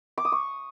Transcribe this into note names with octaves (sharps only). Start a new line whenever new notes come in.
D6
D#6
C#6